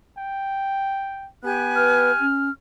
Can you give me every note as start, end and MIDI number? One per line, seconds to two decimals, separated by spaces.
0.18 1.28 79
1.44 2.13 59
1.44 2.23 67
1.44 2.23 80
1.44 2.23 90
1.76 2.12 71
1.76 2.52 89
2.20 2.49 61